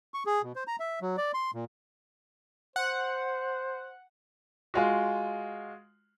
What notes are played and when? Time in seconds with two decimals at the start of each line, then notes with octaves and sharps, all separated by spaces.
0.14 C#6
0.26 G#4
0.43 B2
0.56 C5
0.67 A#5
0.80 E5
1.01 F#3
1.17 D5
1.34 C6
1.54 A#2
2.76 C5 F#5
4.74 G#3 F4 F#4